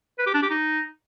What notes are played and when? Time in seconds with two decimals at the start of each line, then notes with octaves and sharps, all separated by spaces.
0.19 B4
0.27 G4
0.34 D4
0.42 G4
0.50 D#4